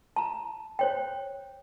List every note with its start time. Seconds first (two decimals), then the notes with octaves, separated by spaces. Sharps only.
0.16 A5 A#5
0.79 C5 C#5 G5